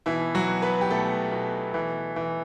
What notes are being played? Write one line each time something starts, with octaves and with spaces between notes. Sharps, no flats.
B2 E3 E4
F#3 F#4
B2
B3 B4
G4
B2 A3 A4
B2
E3
E3